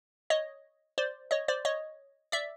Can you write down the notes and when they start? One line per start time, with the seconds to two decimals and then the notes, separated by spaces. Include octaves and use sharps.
0.30 C#5 D#5
0.98 C5 D5
1.31 C#5 D#5
1.48 C5 D5
1.65 C#5 D#5
2.32 D5 E5